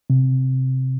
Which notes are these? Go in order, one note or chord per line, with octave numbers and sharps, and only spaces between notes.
C3